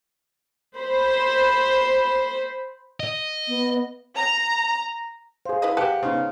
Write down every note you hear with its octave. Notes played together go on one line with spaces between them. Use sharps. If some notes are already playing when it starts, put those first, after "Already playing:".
C5 B5
D#5
B3
A#5
G#4 C5 F5
E4 B4 D#5
G4 B4 F#5 A5
C#3 B3 D#4 C5